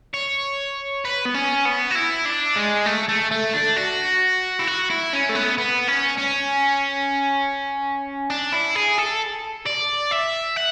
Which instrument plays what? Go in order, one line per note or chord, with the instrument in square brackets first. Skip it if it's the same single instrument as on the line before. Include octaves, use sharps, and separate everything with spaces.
[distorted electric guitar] C#5
B4
B3
C#4
B3
F#4
E4
D4
G#3
A3
A3
A3
D4
F#4
E4
F#4
E4
C#4
A3
B3
B3
C#4
C#4
D4
E4
G#4
A4
D5
E5
F#5